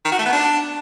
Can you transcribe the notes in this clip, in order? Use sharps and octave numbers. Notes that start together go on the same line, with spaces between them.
D#3
F#4
A3
B3
D4